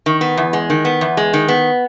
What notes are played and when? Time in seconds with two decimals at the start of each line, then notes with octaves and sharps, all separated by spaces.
0.06 D#3
0.21 B3
0.37 E2
0.53 G#3
0.70 D#3
0.85 B3
1.01 E2
1.17 G#3
1.33 D#3
1.48 B3